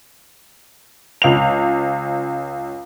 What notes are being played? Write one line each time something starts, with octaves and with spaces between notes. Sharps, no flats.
C#2 F7